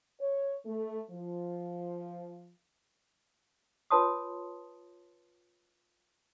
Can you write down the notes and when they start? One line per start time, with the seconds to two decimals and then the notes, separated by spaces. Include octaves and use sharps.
0.20 C#5
0.66 A3
1.10 F3
3.91 F4 B4 C#5 A5 C6 D#6